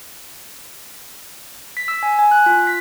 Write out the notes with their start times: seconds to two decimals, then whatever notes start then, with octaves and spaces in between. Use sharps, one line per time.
1.77 B6
1.88 E6
2.03 G#5
2.19 G#5
2.31 F#6
2.46 F4
2.67 B6